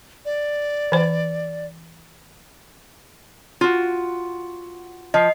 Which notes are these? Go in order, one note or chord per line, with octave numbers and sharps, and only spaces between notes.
D5
E3 C5
F4 F#4
F3 D#5 C7